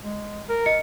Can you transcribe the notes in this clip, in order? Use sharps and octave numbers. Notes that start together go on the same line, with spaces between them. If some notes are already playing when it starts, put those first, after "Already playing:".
G#3
A#4
D#5 C#7